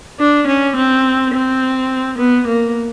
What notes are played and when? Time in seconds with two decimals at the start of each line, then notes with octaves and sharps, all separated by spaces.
0.20 D4
0.47 C#4
0.76 C4
1.33 C4
2.18 B3
2.47 A#3